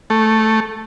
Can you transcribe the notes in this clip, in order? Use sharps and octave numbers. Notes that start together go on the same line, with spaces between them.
A3